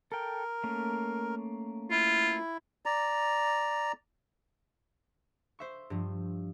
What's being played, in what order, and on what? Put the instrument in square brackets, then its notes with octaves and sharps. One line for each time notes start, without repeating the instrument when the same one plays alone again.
[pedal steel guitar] A4 G5 [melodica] A#4
[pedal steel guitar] A3 A#3 C#4
[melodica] E4 [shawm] F4
[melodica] D5 A#5
[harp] C5 E5 C#6
G2 F3